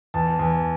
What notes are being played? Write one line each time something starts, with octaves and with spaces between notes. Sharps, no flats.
E2 A5
E2